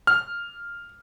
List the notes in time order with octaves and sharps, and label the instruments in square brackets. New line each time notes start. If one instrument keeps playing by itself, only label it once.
[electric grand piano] F6